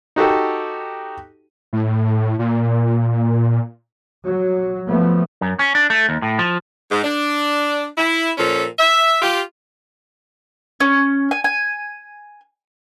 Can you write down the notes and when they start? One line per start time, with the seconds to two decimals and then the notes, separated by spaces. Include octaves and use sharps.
0.16 D#4 F#4 G4 A4
1.73 A2
2.39 A#2
4.26 F#3
4.88 F3 A3 B3
5.41 F#2
5.59 C#4
5.75 D4
5.90 A3
6.09 D#2
6.22 A2
6.39 F3
6.91 G#2
7.04 D4
7.98 E4
8.38 A#2 F3 C#4 A4
8.79 E5
9.22 F4 G4
10.80 C#4
11.31 G#5
11.44 G#5